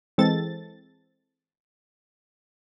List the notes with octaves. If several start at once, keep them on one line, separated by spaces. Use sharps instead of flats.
E3 G#3 C4 A4 A6